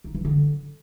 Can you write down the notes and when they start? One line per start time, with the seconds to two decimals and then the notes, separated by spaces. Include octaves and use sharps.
0.04 D#4
0.15 E3
0.25 D3